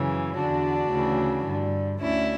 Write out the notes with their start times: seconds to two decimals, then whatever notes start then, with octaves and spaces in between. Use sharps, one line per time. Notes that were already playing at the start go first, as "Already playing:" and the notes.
Already playing: F#2 C#3 E3
0.38 E2 D3 D4 F#4
0.91 D2 C#3 E3
1.46 G2 D3
2.00 D2 D3 C#4 E4